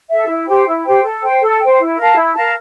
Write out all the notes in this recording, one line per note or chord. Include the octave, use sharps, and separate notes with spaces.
A4 E5
E4
G4 C5 G5
E4
G4 C5 G5
A4
C5 G5
A4
C5 G5
E4
A#4 F5 A5
E4
A#4 F5 A5